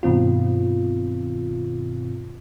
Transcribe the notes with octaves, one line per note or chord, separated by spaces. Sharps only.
G2 B2 D#3 C4 F4